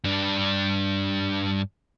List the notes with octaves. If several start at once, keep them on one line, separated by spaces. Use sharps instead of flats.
G2 D4